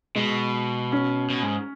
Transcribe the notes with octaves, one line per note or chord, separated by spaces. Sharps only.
B2 G#3
C#4
B2
G#2